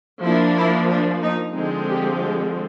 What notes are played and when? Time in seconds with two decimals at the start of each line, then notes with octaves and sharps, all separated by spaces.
0.23 F3 A#3 D4 E4
0.56 E4
0.89 D4
1.22 D#4
1.55 D3 F3 G#3 C4 D#4
1.88 G4
2.20 G4